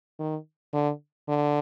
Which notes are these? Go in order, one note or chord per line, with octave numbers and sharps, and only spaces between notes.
D#3
D3
D3